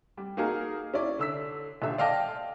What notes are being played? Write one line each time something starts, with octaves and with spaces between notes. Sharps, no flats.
G3
A#3 D#4 F#4 G#4 A#4
C#4 E4 D5
D3 E6 B6
D#1 D3 E5
D5 D#5 F5 G5 A5 A#6